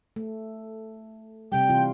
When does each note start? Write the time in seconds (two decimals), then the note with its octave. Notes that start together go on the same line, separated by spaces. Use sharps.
0.16 A3
1.52 C3 G3 G5
1.69 C3 E3 F4